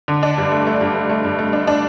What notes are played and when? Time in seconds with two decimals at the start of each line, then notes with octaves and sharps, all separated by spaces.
0.08 D3
0.23 D4
0.38 G2
0.52 A3
0.67 A3
0.81 G2
0.95 A3
1.10 A3
1.24 G2
1.39 A3
1.53 D4
1.67 D4